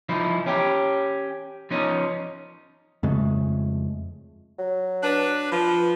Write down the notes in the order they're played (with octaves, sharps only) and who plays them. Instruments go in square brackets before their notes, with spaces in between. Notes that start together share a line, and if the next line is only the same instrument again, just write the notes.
[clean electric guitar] F3 D#4 E4
C#4 G4
F3 C#4 D#4
[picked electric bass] F2 C#3 G#3 A3
[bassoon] F#3
[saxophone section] D4 B4
[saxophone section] F3 [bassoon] B4